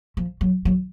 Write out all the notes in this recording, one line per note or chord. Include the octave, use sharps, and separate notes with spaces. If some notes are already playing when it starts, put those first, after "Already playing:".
F3
F#3
F#3